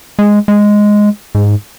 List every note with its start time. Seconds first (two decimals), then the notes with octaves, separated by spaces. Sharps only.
0.19 G#3
0.48 G#3
1.35 G#2